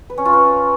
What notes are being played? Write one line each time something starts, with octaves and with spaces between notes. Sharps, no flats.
B4
C#4
F4
B4